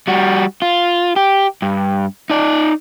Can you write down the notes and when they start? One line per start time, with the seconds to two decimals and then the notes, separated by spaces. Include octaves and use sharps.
0.07 G3 F#4
0.62 F4
1.16 G4
1.62 G2
2.30 D#4 D5